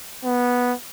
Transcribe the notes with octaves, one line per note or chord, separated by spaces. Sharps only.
B3